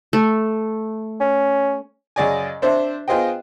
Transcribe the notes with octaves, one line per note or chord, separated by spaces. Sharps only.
A3
C#4
F#2 C#3 G#4 D5 D#5 G#5
C4 D4 C5 E5
B3 F4 G#4 C5 D#5 G5